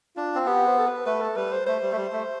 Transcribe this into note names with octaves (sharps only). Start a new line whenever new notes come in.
D4 F4
C4
B3 G4
C5
A4
B4
A3 B4
A4
G3 B4
C5
A3 C5
G3
A3
G3
A3